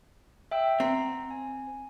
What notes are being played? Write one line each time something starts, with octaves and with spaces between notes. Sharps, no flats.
E5 G5 E6
C4 F#5 A#5
G#5